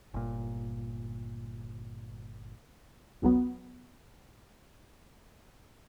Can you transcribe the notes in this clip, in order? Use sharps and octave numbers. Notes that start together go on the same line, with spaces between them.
G1 A#2
G1 C#2 F#3 B3